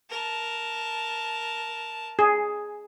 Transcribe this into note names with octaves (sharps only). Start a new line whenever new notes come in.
A#4 A5
G#4